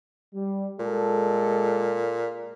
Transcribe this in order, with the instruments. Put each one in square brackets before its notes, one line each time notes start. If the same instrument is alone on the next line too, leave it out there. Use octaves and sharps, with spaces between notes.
[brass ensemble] G3
[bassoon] A#2 [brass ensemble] G#3 A4